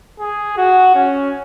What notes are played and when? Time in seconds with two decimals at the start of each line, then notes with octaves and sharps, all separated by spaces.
0.19 G#4
0.57 F#4
0.95 C#4